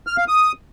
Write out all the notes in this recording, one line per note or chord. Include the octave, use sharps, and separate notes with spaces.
F6
F5
D#6